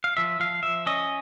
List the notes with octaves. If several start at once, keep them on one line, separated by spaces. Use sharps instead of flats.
F5
F3 E5
F3 F5
F3 E5
C#4 D#5